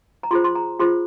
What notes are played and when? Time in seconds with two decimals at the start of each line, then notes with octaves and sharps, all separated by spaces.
0.23 A#5
0.31 F4 G#4 C5 C6
0.44 C6
0.55 A#5
0.80 F4 G#4 C5 C6